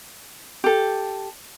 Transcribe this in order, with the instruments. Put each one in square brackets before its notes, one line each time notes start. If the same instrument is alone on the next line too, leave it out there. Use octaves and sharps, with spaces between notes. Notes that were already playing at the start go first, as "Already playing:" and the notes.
[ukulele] G4 A4